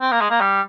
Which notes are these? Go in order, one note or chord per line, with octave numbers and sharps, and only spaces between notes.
C4
A#3
G#3
A#3
G3